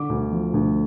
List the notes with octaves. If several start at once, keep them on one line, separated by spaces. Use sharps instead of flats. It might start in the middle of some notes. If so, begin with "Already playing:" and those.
Already playing: D3 D6
D2
F3
D2